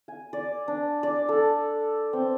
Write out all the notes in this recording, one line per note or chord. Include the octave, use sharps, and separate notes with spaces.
G#5
D5
D4
D5
A4
C4